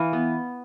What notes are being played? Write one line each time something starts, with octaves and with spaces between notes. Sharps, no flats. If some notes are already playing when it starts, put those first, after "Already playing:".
Already playing: E3 F5
B3